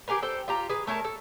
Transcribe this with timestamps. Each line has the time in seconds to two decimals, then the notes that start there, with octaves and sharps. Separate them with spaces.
0.08 G4 G#4 A#4 B4
0.22 A4 C5 G5
0.48 F4 G4 A#5
0.69 G#4 B4
0.87 A3 A#4 C#5 A5
1.04 A4